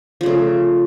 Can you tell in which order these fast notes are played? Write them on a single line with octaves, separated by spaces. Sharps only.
F3 C#3 A3